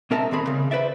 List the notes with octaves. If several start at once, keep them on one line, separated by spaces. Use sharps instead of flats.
B2 C4 A#4 E5 A5 A#5
D#2 A#2 C4 G#4 B5
C#3
B4 C5 D5 E5